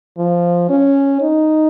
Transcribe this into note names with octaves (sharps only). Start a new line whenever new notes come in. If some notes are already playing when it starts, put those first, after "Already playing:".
F3
C#4
D#4